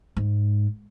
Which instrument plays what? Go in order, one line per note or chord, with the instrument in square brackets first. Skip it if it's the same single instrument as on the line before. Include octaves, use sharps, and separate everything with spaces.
[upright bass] G#2